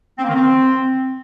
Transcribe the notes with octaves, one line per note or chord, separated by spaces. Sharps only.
C4
A#3
D#3
C4